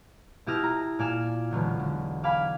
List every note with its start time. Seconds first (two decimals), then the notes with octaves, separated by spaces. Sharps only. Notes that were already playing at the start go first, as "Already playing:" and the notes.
0.46 B2 E4 G4 D#6 F6 A#6
0.64 A#5
0.99 A#2 D5 G#5 F6 E7
1.51 E1 B1 D3
1.79 D3
2.23 D5 F5 G#5 B5